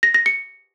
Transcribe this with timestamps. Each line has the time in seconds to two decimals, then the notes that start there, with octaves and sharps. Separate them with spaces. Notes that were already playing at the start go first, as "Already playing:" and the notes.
0.03 A#6
0.14 A#6
0.26 C#7